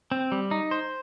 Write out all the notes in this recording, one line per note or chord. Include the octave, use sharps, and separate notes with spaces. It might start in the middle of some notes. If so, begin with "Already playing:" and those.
C4
G3
D#4
C5